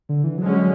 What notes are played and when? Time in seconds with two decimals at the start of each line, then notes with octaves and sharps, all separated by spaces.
0.09 D3
0.24 E3
0.38 D3 F#3 G#3 C#4
0.53 F#3